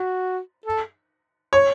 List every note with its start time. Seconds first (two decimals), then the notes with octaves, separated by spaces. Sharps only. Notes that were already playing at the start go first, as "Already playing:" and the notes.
Already playing: F#4
0.66 A4
1.53 C#5